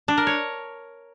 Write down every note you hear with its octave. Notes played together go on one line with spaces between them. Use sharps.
D4
A#4
C#5